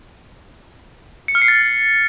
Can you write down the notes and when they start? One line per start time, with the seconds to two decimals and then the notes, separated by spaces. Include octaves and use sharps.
1.28 C#7
1.35 F6
1.42 C7
1.48 A6